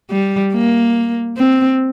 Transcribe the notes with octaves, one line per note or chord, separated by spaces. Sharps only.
G3
A#3
C4